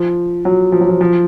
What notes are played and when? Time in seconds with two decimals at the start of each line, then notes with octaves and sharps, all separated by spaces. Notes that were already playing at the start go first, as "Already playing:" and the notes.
Already playing: F3
0.45 F#3
0.72 F3
0.81 F#3
0.89 F3
1.01 F3